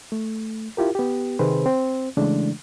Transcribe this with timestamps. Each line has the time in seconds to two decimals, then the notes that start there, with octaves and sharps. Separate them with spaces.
0.12 A3
0.77 E4 F4 G4 A#4
0.95 B3 G4
1.39 C3 D#3 C4 G#4 B4 C5
1.66 C4
2.17 C#3 E3 G#3 A3 D4